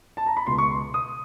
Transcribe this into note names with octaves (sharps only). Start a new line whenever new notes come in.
A5
A#5
B5
C#2 B2 C6
C#6
C6
D#6